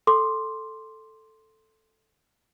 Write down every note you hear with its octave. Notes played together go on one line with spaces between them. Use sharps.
A4 C6 D6